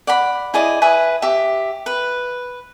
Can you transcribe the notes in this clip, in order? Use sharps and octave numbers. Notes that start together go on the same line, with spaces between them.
D5 F#5 B5
E4 G#4 D5 D#5
B4 E5 G#5 D#6
G4 E5
B4